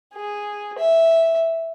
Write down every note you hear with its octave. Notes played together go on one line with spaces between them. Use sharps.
G#4
E5